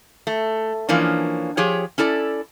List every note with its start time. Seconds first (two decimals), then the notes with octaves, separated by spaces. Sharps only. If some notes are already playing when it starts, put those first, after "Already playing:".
0.27 A3
0.89 E3 F3 A#3 C#4 D4
1.57 F3 G4 G#4 C#5
1.98 C#4 E4 A4 D5